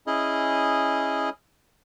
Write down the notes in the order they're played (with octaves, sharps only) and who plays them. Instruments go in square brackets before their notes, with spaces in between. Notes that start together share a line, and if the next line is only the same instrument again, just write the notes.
[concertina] C#4 E4 G#4 D#5